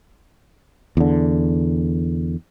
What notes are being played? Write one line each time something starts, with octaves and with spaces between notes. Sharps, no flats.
E2 D3